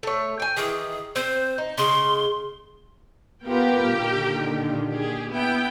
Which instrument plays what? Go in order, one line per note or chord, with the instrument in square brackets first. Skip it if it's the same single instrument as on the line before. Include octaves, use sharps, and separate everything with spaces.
[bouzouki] A3 C#5
G5 G#5
[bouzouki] D#3 E3 [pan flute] G#4
[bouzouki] C4 [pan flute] C5
[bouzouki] D#4
[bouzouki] C#3 G#3 [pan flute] C6
[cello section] B3 F4 B4 [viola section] G4 A#4 G5
[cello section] A#2 D3 D#3
[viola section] G4 G#4
B3 E4 G5